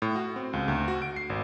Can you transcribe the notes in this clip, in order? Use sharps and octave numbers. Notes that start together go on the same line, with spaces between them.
A2
F#4
C4
C#2
D2
F#4
D7
C7
G#1